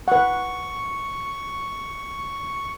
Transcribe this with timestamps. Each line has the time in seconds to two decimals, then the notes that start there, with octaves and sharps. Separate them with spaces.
0.08 B4 F#5 C#6